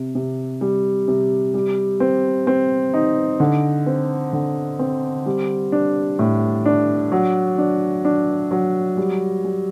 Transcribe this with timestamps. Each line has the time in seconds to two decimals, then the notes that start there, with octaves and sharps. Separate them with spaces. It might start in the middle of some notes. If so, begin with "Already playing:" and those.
Already playing: C3
0.15 C3
0.61 G3
1.08 C3
1.54 G3
2.00 C4
2.47 C4
2.94 D#4
3.40 D3
3.86 C4
4.33 D3
4.79 C4
5.26 G3
5.72 D4
6.19 A2
6.66 D4
7.12 F#3
7.58 D4
8.05 D4
8.51 F#3
8.97 G3
9.44 G3